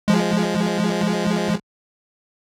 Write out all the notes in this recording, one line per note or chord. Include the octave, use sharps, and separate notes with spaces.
F3 G#3